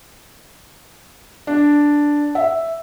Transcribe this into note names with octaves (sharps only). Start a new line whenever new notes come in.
D4
E5